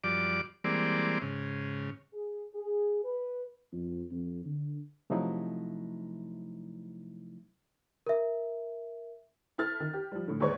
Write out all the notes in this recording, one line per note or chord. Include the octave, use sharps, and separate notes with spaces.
F#2 F3 G3 D5 D6
E3 G3 G#3 A#3 C4 D5
G#2 C#3
G#4
G#4
B4
F2
F2
D3
C3 F3 F#3 A3 D#4 E4
A#4 E5
E4 A4 F6 A6
D#3
G4
F3 G3
A2 D3
D#2 G#3 B4 C#5 D5 C#6